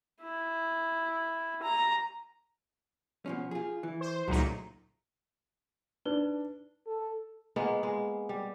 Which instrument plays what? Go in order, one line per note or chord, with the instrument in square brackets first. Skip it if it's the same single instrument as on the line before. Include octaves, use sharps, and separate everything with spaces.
[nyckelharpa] E4
A#5
[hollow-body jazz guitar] B2 F3 C#4
F4 G#4
E3
[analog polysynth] C5
[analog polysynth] C#2 A#2 D#4 [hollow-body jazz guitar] F#3 A3
[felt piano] D4 [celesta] D#4 B4 G7
[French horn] A4
[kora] G#3 A#3 B3 F4
G#3
G3